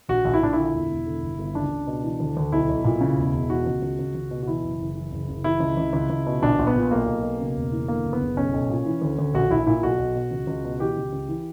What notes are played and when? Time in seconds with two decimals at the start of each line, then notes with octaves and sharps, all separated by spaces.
0.09 A#1 F#4
0.25 A#1
0.34 E4
0.42 A#2 D4
0.53 D3 E4
0.74 E1
0.90 E1
1.07 D3
1.23 G1
1.39 G1
1.55 C#2 D4
1.71 C#2
1.87 B2
2.04 E3
2.20 D2
2.37 D2
2.52 B1 E4
2.69 B1
2.84 A#2
3.01 C#3
3.17 E1
3.33 E1
3.49 E3 F#4
3.66 C#2
3.82 C#2
3.99 C#2
4.15 C#2
4.31 B2
4.43 F#4
4.47 E3 E4
4.63 F#1
4.80 F#1
4.95 E3
5.12 F#1
5.29 F#1
5.44 E3 E4
5.60 C#2
5.77 C#2
5.93 C#2
6.10 C#2
6.26 B2
6.42 A#1 D4
6.59 A#1
6.67 B3
6.75 A#2
6.91 B1 A#3
7.07 B1
7.23 B2
7.40 C#3
7.56 E1
7.72 E3
7.88 D3 A#3
8.04 F#1
8.13 B3
8.21 F#1
8.37 B1 C#4
8.54 B1
8.70 A#2
8.86 E3
9.02 D2
9.19 D2
9.34 A#1 F#4
9.50 A#1 E4
9.67 A#2 E4
9.83 B1 F#4
9.99 B1
10.16 B2
10.31 C#2
10.47 C#2
10.65 B2
10.80 E3 G4
10.97 C#2
11.13 C#2
11.29 E3